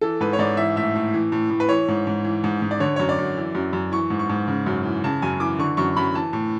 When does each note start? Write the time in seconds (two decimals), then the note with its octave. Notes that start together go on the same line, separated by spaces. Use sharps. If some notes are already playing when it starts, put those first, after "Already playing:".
0.01 E3 A4
0.20 G#2 B4
0.33 C#5
0.39 G#2 D5
0.57 E3 E5
0.76 A2 E5
0.95 A2
1.14 E3
1.32 A2
1.50 A2
1.60 B4
1.69 E3 C#5
1.88 G#2
2.07 G#2
2.25 E3
2.44 G#2
2.62 G#2
2.71 D5
2.80 D3 C#5
2.96 F#2 C#5
3.09 D5
3.18 F#2
3.37 E3
3.55 F#2
3.73 F#2
3.92 E3 C#6
4.10 G#2
4.19 C#6
4.29 G#2
4.48 C#3
4.66 F#2
4.86 E3
5.04 C#3 A5
5.22 F#2 G#5
5.40 E3 D6
5.59 D3 C#6
5.77 F#2 C#6
5.97 F#2 B5
6.14 E3 A5
6.33 A2